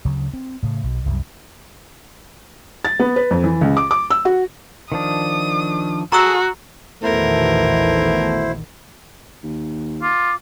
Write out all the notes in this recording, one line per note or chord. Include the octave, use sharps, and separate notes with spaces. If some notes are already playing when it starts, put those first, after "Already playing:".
D2 C#3 F#3
C4
A2 C#3
B1
C2 F#2 G3
A6
B3
B4
F2
E3
C#2
D6
D6
E6
F#4
D#3 F3 D4 D#6
F#4 G#4 A4 A#5 C#6 E6
A#1 E2 B2 D#3 A3 E4 A#4 C5
D#2
F4 D6